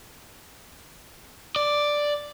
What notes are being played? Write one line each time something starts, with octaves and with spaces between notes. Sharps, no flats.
D5